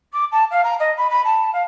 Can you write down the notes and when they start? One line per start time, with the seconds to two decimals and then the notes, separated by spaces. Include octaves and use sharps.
0.13 D6
0.31 A5
0.50 F5
0.63 A#5
0.79 D#5
0.96 B5
1.09 B5
1.24 A5
1.53 F5